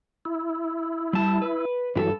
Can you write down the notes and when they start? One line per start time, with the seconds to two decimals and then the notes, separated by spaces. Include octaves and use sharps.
0.25 E4
1.13 G3 A5
1.42 B4
1.96 G2 E3 F#3 G4 A4